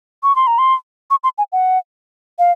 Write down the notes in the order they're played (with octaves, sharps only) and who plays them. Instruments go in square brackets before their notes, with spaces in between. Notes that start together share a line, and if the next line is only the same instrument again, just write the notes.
[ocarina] C#6
C6
A#5
C6
C#6
C6
G#5
F#5
F5